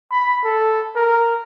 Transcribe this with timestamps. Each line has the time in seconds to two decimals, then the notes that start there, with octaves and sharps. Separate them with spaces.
0.11 B5
0.44 A4
0.96 A#4